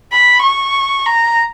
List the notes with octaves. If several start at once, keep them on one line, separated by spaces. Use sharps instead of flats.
B5
C#6
A#5